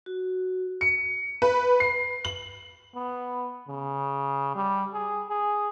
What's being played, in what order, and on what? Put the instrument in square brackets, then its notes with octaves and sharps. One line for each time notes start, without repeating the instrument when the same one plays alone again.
[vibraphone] F#4
[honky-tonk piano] C#7
B4
C7
F#7
[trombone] B3
C#3
G3
G#4
G#4